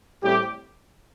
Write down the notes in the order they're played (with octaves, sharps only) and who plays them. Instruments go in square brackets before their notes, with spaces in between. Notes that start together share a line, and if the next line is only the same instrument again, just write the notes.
[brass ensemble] A2 G3 C4 G4